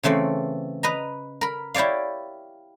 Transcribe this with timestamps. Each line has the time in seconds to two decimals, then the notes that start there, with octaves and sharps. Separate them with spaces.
0.03 C#3 E3 A3 C4
0.83 B4 D#5 A#5
1.41 A#4 B5
1.74 E4 G4 C#5 D5 F5